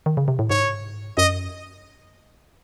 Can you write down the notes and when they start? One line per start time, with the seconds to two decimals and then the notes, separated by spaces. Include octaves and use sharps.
0.06 D#3
0.17 C#3
0.28 C3
0.39 A2
0.50 G#2 C#5
1.17 F#2 D#5